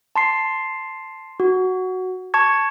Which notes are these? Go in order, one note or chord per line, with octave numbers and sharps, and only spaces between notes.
A5 C6 C7
F#4
A5 C#6 G#6